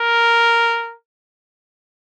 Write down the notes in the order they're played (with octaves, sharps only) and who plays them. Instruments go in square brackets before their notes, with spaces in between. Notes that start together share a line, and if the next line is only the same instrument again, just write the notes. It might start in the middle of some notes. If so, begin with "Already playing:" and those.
Already playing: [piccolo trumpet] A#4